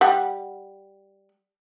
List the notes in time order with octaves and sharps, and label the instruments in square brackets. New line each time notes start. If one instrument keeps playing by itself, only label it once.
[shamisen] G3 F#5